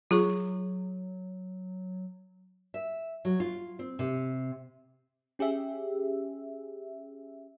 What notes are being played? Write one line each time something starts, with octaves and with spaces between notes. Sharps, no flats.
F#3 F4 G#4 C#6
E5
F#3
F4
C4
C3
C#4 G4 G#4 E5